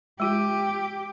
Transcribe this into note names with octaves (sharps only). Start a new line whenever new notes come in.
G#3 F4 G4